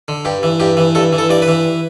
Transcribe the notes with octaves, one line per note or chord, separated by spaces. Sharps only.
D3
G2 G4
E3
G2 G4
E3
G2 A4
E3
A4
G2 D5
B4
E3